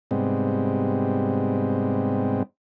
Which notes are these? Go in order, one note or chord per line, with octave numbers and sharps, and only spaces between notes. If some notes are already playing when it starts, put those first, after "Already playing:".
G#2 C3 G3 G#3 B3 C4